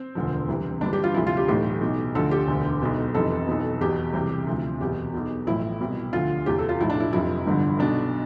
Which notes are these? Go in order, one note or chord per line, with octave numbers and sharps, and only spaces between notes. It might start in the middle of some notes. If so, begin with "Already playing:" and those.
Already playing: C4
E1 D2 D3 F3
C2 C3 E3
G1 G2 E3 D4
G4
F4
D2 C3 F3 E4
F4
G4
B1 A2 E3 G4
B1 B2
D2 D3 F3 A4
G4
E1 D2 D3
B1 B2
F1 F2 C3 E3 A4
B1 B2
E2 B2 G4
C2 C3 E3
D2 C3 F3
E2 B2 G4
B1 B2
A1 A2 F3 E4
C2 B2
D2 D3 F3 F4
E2 C3 E3 G4
A4
F4
B1 A2 F3 E4
D4
E4
F1 F2 C3 F3 E4
G1 G2 D3 F3
B1 B2 D4